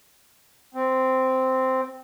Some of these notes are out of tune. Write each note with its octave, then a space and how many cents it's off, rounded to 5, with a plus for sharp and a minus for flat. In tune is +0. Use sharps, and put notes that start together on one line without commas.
C4 -5